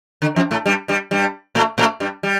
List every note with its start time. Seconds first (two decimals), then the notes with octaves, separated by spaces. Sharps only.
0.22 D3
0.36 F2 F3
0.51 A2 A3
0.66 G2 G3
0.88 G2 G3
1.11 G2 G3
1.55 A2 A3
1.78 A2 A3
2.00 G2 G3
2.23 G3